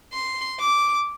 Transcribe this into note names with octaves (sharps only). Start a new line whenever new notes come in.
C6
D6